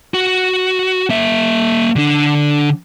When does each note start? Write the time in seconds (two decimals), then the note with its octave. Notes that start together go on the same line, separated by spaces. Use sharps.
0.14 F#4
1.10 A#3 E5
1.96 D3 D4